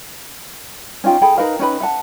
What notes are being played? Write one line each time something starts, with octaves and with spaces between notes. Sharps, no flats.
C#4 D#4 F4 G5
G#4 A4 G5 B5
D#4 A#4 B4 F5
C#4 D#4 B4 B5
E5 F#5 A5